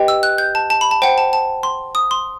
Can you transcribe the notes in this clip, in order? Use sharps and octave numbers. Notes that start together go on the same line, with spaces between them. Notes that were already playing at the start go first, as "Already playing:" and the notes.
Already playing: G4 B4 D#5 G5
E6
F#6
G6
A5
A5
B5
A5
C5 F#5 G5
A5
A5
C6
D#6
C6